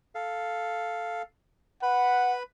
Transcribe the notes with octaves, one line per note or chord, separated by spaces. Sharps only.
A4 F5
B4 F#5 B5